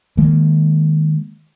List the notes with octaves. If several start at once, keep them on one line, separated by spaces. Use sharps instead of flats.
D#3 G#3 A#3